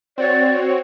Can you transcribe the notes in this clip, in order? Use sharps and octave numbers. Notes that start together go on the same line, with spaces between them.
C4 F#4 C#5 D5